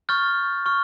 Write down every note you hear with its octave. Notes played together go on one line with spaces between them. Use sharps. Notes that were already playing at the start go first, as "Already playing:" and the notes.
C#6 F6 G6 A6
C#6 F6